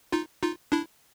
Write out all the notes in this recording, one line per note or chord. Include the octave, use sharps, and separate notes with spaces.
D#4 F4
D#4 F4
D4 E4